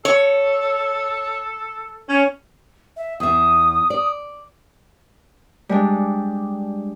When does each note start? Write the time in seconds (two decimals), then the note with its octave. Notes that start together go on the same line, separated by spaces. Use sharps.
0.05 A4 C#5
2.07 C#4
2.96 E5
3.20 E2 E5 D#6
3.90 D5
5.69 G3 G#3 D4